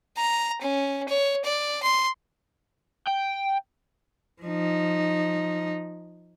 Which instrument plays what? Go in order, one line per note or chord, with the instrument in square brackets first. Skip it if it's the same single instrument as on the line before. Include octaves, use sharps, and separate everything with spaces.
[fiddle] A#5
C#4
C#5
D5
C6
[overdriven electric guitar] G5
[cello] F3 D#4